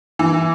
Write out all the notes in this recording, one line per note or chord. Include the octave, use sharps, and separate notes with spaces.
E3